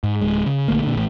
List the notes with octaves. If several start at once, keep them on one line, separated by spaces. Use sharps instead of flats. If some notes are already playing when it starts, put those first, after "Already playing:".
G#2
D1 G#3
C#3
A#1 D3 A3 A#3
A#2 D3
A1 A2